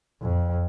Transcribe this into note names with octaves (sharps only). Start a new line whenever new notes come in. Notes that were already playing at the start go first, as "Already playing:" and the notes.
F2